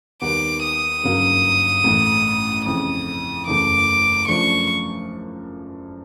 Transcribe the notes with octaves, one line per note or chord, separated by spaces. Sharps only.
D#2 D#3 G3 B3 D6
D#6
G1 F#2 C#3 F#3 A#3
A1 A2 E3
F2 C#3 E3 D#6
F#1 E2 C#3 E3 A3 D6
F#2 C#3 F3 A3 D4 C#6